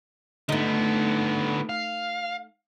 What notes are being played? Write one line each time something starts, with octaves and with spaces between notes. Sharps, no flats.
D3 A3 B3 D#4
F5